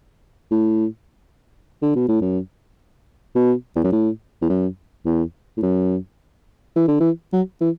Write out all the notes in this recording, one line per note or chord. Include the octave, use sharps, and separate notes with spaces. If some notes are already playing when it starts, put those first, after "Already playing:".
A2
D3
B2
A2
F#2
B2
E2
F#2
A2
E2
F#2
E2
A2
F#2
E3
D3
E3
F#3
E3